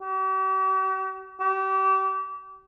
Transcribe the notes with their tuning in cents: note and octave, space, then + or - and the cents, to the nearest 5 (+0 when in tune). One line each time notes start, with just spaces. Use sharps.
G4 -45
G4 -35